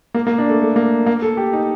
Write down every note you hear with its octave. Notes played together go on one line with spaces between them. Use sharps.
A#3
A#3
D4
A3
A3
A#3
A#3
A4
G4
D#4